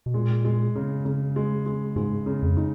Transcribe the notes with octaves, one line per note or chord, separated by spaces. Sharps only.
B2
A#2 G#3
G#3
C#3
C#3
G#3
G#3
G#2 G#3
C#3
F2
D#4